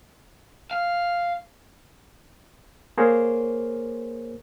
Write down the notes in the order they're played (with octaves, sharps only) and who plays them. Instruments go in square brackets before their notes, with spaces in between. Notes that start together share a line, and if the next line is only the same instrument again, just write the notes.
[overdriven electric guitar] F5
[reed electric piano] A#3 G#4 A#4 C5 C#5